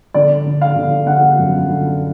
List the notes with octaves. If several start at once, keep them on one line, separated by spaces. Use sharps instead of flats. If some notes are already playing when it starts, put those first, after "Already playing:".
D3 D5
D3
F5
D3
D3 F#5
F#2
D3